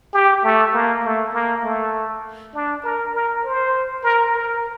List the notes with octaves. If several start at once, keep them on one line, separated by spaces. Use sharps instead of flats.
G4
A3
A#3
A3
A#3
A3
D4
A#4
A#4
C5
A#4
A#4